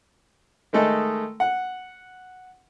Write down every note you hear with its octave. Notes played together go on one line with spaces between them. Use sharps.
D#3 G#3 A3 D#4 A4
F#5